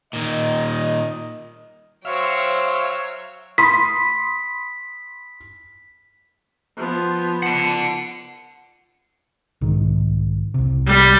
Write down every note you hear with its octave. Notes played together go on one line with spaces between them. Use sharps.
A#2 D#3 D#5
F#3 C5 C#5 E5 F5 G5
B5 C6 D#6 B6
F3 B3
F#5 A5
B1 G#2 D#3
C2 C3
G3